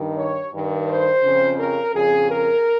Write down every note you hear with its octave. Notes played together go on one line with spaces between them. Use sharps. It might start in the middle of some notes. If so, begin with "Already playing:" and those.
Already playing: G2 D#3
C#5
G2 D#3
C5
F2 C#3
A#4
F2 C#3 G#4
A#4